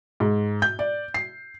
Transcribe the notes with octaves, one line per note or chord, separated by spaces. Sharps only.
G#2
G6
D5
C7